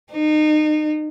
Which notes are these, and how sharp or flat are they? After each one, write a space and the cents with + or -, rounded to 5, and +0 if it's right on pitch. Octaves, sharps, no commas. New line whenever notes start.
D#4 -30